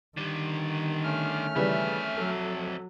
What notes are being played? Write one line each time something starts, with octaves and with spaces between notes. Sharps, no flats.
D3 D#3 G3
A3 C#4 F6
F2 C#3 E3 G3 E5
F#3 A4